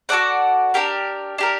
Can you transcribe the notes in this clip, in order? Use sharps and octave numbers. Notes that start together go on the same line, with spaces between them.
F#4 A4 D5 F#5
D4 G4 A#4
D4 G4 A#4